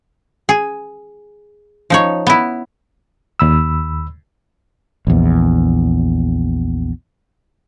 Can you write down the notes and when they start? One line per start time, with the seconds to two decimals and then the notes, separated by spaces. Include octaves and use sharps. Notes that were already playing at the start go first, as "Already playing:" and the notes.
0.49 G#4
1.90 F3 D#4 C#5
2.27 B3 E4
3.40 D#2 B5 E6
5.07 A#1 E2